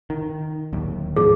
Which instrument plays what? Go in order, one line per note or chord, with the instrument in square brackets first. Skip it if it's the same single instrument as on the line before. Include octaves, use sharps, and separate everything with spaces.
[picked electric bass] D#3
D1 D#2
[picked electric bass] G#2 B2 F3 [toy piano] G#4